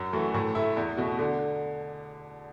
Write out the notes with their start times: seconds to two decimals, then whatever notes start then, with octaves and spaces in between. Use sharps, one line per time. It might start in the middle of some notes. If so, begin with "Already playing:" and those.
Already playing: F#2
0.13 E3 A3 F#4
0.34 A2
0.55 A3 E4
0.77 E2
0.98 B2 A3 F#4
1.19 D3